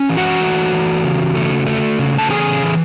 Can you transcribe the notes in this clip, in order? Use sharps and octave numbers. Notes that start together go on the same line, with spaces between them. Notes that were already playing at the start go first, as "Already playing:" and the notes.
Already playing: C#4
E3
F#4 F#5
A3
E3
C#3
A3
A3
C#3
A5
E3 G#4 G#5
E3